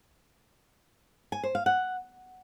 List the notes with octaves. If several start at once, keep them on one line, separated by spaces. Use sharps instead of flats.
G#5
C5
F5
F#5